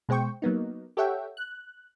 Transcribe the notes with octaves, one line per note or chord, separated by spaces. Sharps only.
B2 G#3 C5 G5 C#6
F#3 A#3 B3 D#4
G4 A4 C#5 E5 F#5 G5
F#6